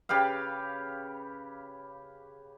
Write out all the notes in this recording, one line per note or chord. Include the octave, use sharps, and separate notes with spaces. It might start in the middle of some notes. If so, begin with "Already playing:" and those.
C#3 G4 B4 F5